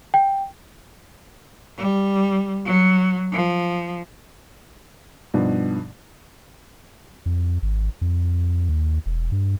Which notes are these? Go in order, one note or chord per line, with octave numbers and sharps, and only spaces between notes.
G5
G3
F#3
F3
G2 B2 F3 G3 B3 D#4
F2
G#1
F2
D#2
E1
G2